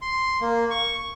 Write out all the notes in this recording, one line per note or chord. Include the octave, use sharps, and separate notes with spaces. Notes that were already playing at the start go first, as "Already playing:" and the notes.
C6
A#3
C#6